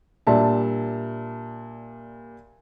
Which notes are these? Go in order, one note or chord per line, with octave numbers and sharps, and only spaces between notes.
A#2 G3 D4 E5 A5